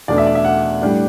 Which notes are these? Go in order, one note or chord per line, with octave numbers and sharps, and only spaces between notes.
E2 B2 A3 D4 D5
E5
D5
E5
F#5
A2 G3 D4